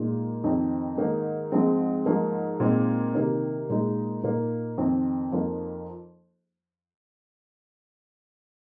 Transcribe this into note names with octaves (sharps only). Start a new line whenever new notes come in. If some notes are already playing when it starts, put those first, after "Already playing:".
Already playing: A#2 G#3 D#4
F2 D#3 C4 D#4
G#2 D#3 A#3 D#4
G#2 F3 G#3 C4
G#2 F3 A#3 D#4
A#2 G#3 C4 D#4
C3 D#3 A#3 D#4
A#2 G#3 D#4
A#2 A#3 D#4
F2 D#3 C4 D#4
F2 F3 A#3 D#4